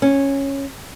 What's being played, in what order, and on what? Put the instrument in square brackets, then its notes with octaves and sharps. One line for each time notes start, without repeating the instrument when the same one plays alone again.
[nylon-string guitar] C#4